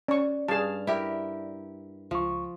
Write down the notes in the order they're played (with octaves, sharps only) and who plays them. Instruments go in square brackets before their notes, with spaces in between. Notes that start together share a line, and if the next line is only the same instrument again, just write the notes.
[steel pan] C#4 C#6 [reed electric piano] D5
[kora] G2 F5 [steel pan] G#4 A5
[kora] E4 G4 A#4
[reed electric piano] C#2 C#6 [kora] F3